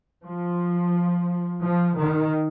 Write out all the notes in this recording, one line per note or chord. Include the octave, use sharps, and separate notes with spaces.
F3
F3
D#3